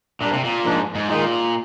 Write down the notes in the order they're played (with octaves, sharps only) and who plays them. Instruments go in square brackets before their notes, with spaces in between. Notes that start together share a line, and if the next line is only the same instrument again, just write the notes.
[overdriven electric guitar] A#2 [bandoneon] G3 A#3 D4
[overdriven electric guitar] C3
A#2
[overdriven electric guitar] G#2 [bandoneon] F3 A#3 D4
[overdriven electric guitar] G#2
[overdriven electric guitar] A#2 [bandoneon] D#3 G#3 D#4